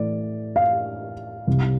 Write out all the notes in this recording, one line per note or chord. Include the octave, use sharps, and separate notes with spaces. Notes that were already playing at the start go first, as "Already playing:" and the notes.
Already playing: A2 E3 A3 D5
F5
C2 C3 G3